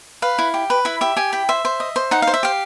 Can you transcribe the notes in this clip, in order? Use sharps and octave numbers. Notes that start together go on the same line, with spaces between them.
B4 F5
E4
G4
B4
E4 E5
G4 E5
G4 G#5
E4 G5
C5 E5
C5
D#5
C5
D#4 F#5
F5
C5
E5
G4 F5